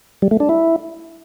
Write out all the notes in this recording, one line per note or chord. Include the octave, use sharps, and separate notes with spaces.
G3
A3
D4
E4